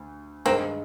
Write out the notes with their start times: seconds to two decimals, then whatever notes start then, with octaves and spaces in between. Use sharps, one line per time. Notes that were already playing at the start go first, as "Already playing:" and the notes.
Already playing: D2
0.45 G2 D#3 G#3 A#3 C4